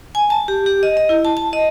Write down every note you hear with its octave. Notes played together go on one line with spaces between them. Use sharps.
G#5
A5
G4
G4
D#5
D#5
E4
A5
A5
D#5